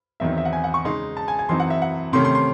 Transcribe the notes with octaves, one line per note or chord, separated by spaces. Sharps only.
E2 D#3 F#3 C4 D#4 E5
E5
F#5
G#5
F#5
C#6
C#3 G#3 D#4 C6
A5
G#5
G#5
F#2 E3 C4 D#4 C6
F#5
E5
F#5
C3 D#3 A3 C#4 C6
C6
C6